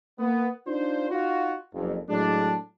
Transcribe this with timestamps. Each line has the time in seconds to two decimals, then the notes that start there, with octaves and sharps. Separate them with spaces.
0.19 A#3 B3
0.67 D4 D#4 F4 C5
1.10 D#4 F4 F#4
1.73 F#1 F2
2.09 A2 F#3 G#3 D4